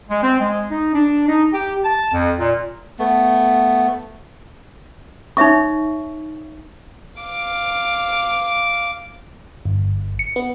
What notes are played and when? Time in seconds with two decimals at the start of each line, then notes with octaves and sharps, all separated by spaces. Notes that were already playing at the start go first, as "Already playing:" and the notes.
0.10 G#3
0.23 C4
0.40 G#3
0.70 D#4
0.94 D4
1.28 D#4
1.53 G4
1.84 A5
2.13 F2
2.39 A#2
2.99 A3 B3
5.37 D#4 C#5 E5 C#6
7.20 F5 D6
9.65 G1
10.19 C#7
10.36 B3